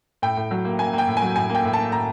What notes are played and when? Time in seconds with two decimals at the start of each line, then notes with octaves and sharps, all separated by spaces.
0.22 A2 G5
0.37 A2
0.51 F#3
0.65 A#3
0.79 A#3 G#5
0.93 A#3
0.98 G5
1.07 A2
1.17 G#5
1.22 F#3
1.36 A2 G#5
1.50 A#3
1.55 G5
1.64 A2
1.73 A5
1.78 A#3
1.92 A2 A#5